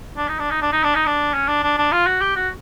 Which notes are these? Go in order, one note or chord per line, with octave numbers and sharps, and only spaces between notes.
D4
D#4
D4
D#4
D4
D#4
D4
D#4
D4
C#4
D4
D4
D4
F4
F#4
G4
F#4